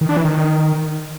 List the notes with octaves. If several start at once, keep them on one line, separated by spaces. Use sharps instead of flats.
D#3
D4
E3
D#3